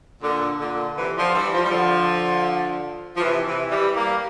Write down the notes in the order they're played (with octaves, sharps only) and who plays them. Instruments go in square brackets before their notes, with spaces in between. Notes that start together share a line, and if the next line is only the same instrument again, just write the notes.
[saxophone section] A#2 D3
A#2 D3
C3 E3
D3 F3
E3 G3
F3
G3
D3 F3
F3
C3 E3
C3 E3
E3 G3
G3 A#3